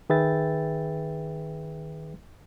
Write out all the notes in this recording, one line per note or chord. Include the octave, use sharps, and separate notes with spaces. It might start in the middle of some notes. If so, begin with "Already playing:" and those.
D#3 G#4 B4 E5 G5 A6